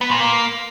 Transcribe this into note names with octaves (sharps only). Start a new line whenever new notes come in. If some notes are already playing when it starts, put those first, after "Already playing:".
B3
A#2
A#3